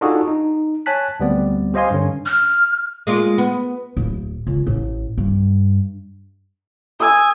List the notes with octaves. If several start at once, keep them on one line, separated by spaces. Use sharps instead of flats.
D4 D#4 F4 F#4 G#4 A4
D#4
C#5 G#5 A5 F#6 B6
D2 G3 B3 C4 D5
G4 C5 D#5 F5 G#5 C6
G2 D3 C#4
F6
G#3 A#3 F4
B3
D1
C#2
A1
G2
G#5 D#6 E6